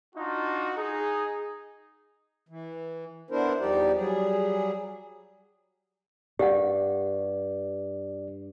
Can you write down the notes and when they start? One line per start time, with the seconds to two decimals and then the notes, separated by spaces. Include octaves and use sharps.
0.16 D4 D#4 F4 F#4
0.78 D#4 G#4
2.49 E3
3.30 B3 D4 E4 A#4 C5
3.59 E2 F3 G3 D#4 G4 D5
3.95 F#3 G3 G#4
6.39 G2 G4 D5 F5 F#5